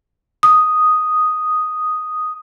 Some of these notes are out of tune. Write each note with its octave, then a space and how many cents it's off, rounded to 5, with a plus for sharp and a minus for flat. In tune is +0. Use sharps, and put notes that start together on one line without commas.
D#6 +0